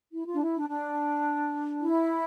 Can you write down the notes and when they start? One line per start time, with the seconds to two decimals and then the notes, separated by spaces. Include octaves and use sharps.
0.12 E4
0.26 F4
0.33 D4
0.40 E4
0.55 D4
0.68 D4
1.81 E4